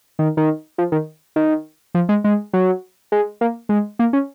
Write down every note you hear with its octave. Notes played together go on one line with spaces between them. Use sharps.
D#3
D#3
F3
D#3
D#3
F3
G#3
G#3
F#3
G#3
A#3
G#3
A#3
C#4